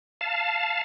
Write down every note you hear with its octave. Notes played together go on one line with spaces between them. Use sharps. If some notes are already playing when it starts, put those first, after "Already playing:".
F5 A5